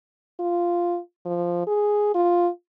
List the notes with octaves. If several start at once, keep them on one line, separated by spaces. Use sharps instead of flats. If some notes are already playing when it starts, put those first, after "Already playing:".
F4
F3
G#4
F4